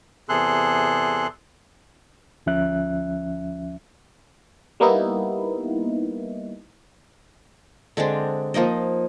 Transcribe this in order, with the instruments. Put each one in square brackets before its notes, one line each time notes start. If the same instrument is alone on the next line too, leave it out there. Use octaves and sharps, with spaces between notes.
[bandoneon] E2 C3 G#4 A4 C6 F#6
[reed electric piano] D2 F3 C#4 E5 F#6
[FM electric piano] G3 A#3 B3 D#4 E4
[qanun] D3 G#3 C4 D4
F3 A#3 D#4 D#5